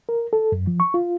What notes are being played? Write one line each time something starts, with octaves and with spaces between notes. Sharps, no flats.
A#4
A4
F#2
F3
C#6
F4